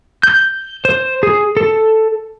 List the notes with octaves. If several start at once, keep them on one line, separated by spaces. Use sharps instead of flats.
G6
C5
G#4
A4